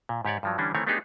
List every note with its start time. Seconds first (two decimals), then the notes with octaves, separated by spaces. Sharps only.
0.09 A#2
0.25 G#2 G4 C#5 D5
0.43 G2 F3 F#3
0.58 D3 E3 G3 C#4 D4
0.75 D#3 E3 A3 C4 C#5
0.87 A3 B3 D4 D#4 G4 G#4